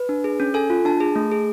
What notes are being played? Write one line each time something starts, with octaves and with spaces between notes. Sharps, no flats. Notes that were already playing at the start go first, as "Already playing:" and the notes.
Already playing: B4
D4
G#4
C#4
A4 G#5
F4
D4 A5
G#4
A3
G#4